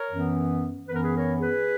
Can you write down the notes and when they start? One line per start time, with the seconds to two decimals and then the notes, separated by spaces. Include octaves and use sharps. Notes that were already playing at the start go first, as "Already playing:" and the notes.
Already playing: A#4 C#5
0.11 F#2 E3 B3
0.88 F#2 E3 B3 B4
0.96 A#4
1.03 G#4 B4
1.14 A#4 C#5
1.40 G#4 B4